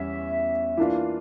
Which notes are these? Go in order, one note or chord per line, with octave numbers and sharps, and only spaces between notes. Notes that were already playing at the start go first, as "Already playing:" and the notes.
Already playing: E2 G3 C#4 E5
E3 A#3 D4 F4 F5